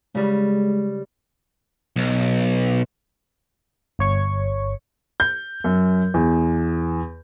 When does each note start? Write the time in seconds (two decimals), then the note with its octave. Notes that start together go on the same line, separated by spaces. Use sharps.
0.15 C#3 G3 G#3
1.96 B1
3.99 G1 C#5 C#6
5.20 G6
5.64 F#2
6.14 E2